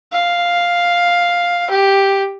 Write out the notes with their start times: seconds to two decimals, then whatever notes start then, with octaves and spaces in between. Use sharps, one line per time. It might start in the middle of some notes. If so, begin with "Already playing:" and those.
0.12 F5
1.70 G4